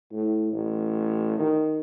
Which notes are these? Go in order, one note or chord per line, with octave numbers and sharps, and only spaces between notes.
A2
A1
D#3